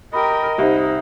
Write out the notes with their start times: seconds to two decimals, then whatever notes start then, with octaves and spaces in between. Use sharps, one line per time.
0.13 G4 A#4 D#5 B5
0.58 C2 D#4 C5 E5